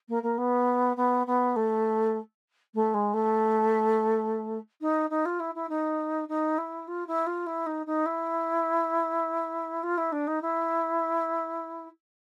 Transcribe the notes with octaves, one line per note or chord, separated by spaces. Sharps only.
A#3
A#3
B3
B3
B3
A3
A3
G#3
A3
D#4
D#4
F4
E4
E4
D#4
D#4
E4
F4
E4
F4
E4
D#4
D#4
E4
F4
E4
D4
D#4
E4